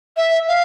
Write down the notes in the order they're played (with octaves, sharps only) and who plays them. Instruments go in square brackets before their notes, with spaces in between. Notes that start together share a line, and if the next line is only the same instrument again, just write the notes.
[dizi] E5
F5